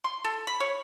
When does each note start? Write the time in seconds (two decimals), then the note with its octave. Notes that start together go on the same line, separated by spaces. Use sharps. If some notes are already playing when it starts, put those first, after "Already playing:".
0.04 C6
0.24 A4
0.47 B5
0.60 C#5